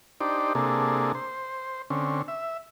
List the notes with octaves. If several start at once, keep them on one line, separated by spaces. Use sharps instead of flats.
D4 D#4 G4 C5 D5
C3 A#3 D4 G#4 A4
C5
D3 C4 C#4
E5